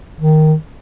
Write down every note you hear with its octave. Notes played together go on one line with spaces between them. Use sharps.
D#3